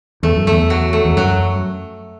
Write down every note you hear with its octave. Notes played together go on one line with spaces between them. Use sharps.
E2 A3
F#2
E2 A3
F#3
A3
E2
F#2 F#3